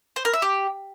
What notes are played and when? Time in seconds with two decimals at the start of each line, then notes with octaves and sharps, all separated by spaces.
0.16 C5
0.25 A#4
0.34 E5
0.42 G4